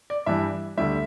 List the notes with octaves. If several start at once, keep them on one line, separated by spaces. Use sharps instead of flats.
D5
G2 E3 G3 E5
D2 D3 G3 E5